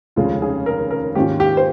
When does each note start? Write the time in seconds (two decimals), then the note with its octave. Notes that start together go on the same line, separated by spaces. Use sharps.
0.16 F1 D#2 C#3 F3 G#3 F4
0.42 G#4
0.66 A#4
0.91 A#4
1.15 G#2 D#3 A#3 C#4 F4 G4
1.40 G4
1.57 C5